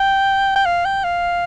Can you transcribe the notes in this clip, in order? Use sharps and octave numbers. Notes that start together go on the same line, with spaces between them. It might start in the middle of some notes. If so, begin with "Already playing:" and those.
Already playing: G5
G5
F5
G5
F5